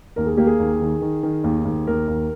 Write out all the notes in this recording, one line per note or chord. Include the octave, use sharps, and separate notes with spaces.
D#2 A#4
G#4
A#3 G4
G#4
D#2
D#3
D#3
D#3
D#2
D#2
D#2 A#4
D#2